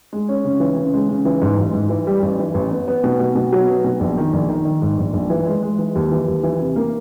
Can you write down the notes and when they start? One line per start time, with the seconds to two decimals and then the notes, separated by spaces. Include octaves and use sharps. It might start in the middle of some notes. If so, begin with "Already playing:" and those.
0.13 G#3
0.29 C#4
0.45 C#3
0.60 E3
0.77 C#3
0.93 G#3
1.09 C#3
1.25 E3
1.42 G#2
1.58 A1
1.73 G#2
1.90 E3
2.07 G3
2.22 A1
2.39 E3
2.54 A1
2.72 B3
2.88 B3
3.04 B2
3.20 B2
3.35 B2
3.52 F#3
3.68 B3
3.84 B2
4.00 A#1
4.17 D#3
4.33 A#1
4.49 D#3
4.65 D#3
4.82 G#2
4.98 A#1
5.13 A#1
5.30 E3
5.47 G#3
5.62 G#3
5.79 E3
5.95 D#2
6.12 E3
6.28 D#2
6.43 E3
6.60 C3
6.76 A#3